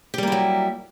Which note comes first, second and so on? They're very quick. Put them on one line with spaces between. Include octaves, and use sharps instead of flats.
G4 G3 A#3 E4 F#3